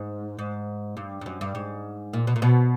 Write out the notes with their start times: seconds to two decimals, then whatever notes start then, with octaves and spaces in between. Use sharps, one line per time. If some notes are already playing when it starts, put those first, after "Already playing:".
Already playing: G#2
0.39 G#2
0.97 G2
1.21 G2
1.26 F#2
1.41 G2
1.55 G#2
2.13 A#2
2.27 B2
2.36 A#2
2.42 B2